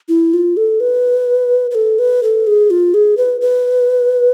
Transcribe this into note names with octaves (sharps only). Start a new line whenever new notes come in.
E4
F4
A4
B4
B4
A4
B4
A4
G#4
F4
G#4
B4
B4